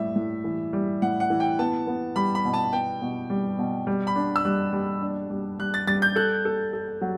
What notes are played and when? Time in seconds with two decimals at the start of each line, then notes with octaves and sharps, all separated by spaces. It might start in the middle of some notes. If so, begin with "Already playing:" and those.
Already playing: A2 G3 E5
0.16 A2
0.44 E3
0.73 G3
1.02 A2 F#5
1.20 F#5
1.30 E3
1.40 G5
1.59 B3 A5
1.87 B3
2.16 G3 B5
2.35 B5
2.45 B2
2.53 A5
2.73 B3 G5
3.02 B2
3.30 G3
3.58 B2
3.87 G3
4.07 B5
4.16 D4
4.36 E6
4.45 G3 F#6
4.73 G3
5.02 D4
5.30 G3
5.59 G3 F#6
5.74 A6
5.87 G3 A6
6.02 G6
6.16 A4 F#6
6.45 A4
6.73 A4
7.01 F#3